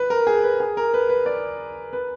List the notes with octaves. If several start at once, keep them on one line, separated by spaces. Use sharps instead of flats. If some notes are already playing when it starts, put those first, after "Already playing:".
Already playing: B4
A#4
G#4
B4
G#4
A#4
B4
B4
D5
B4